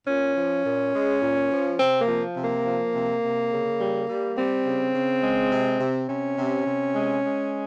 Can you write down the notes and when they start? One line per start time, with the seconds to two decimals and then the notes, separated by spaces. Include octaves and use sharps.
0.07 A#2 C#4
0.36 F3
0.64 A#2
0.93 G#3
1.22 A#2
1.50 F3
1.79 C3 C4
2.01 A#3
2.08 F3
2.36 C3
2.43 A#3
2.65 F3
2.93 C3
3.23 C3
3.51 C#3
3.79 G3
4.08 G3
4.37 G3 C4
4.65 C#3
4.94 C#3
5.22 G#3
5.52 C3
5.79 C3
6.08 C3 C#4
6.38 C3
6.66 C3
6.94 G#3
7.24 G#3